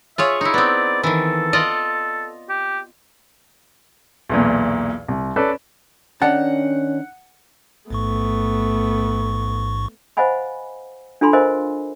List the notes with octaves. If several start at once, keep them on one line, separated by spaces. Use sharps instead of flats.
F4 G#4 C#5 E5
D#4 E4 C#6
B3 C4 D5
D#3 E3 A4
F4 D5 D#5
G4
B1 E2 A#2
C2
C#4 A4 B4 D5
D#3 C#4 D4 F#5 A5
A1 G#2 A3 B3 C#6
C5 D#5 F5 F#5 G#5 B5
D4 F4 A4 G#5 B5 C6
A#4 C5 D#5 F5 G#5